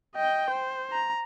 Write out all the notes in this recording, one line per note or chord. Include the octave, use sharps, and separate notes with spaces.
D#5 G5
C5
A#5